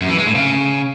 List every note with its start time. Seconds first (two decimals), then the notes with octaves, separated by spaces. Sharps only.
0.02 F#2
0.10 E3
0.18 G#3
0.27 A2
0.35 C#3